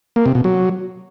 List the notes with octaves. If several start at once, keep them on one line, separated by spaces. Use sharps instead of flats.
A#3
C3
B2
F#3